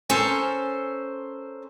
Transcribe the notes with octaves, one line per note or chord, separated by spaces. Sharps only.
C#4 A4 A#4 C5